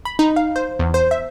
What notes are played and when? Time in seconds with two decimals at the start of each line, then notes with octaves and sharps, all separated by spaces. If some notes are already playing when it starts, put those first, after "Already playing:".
0.05 B5
0.19 D#4
0.36 F5
0.56 C5
0.79 E2
0.94 C5
1.11 E5